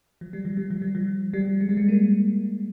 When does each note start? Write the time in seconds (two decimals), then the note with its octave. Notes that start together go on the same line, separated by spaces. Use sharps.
0.21 F3
0.33 G3
0.45 F3
0.57 G3
0.70 F3
0.82 G3
0.95 F3
1.33 G3
1.61 G#3
1.69 G3
1.77 G#3
1.88 A#3